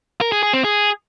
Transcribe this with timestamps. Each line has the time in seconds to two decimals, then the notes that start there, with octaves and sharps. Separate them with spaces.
0.21 A#4
0.32 G#4
0.43 G#4
0.53 C4
0.64 G#4